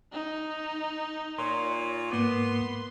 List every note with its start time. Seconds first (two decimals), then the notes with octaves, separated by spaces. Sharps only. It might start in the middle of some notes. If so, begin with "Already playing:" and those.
0.12 D#4
1.38 A#2 C#5 C6
2.12 G#2 A#3 B3 C6 D6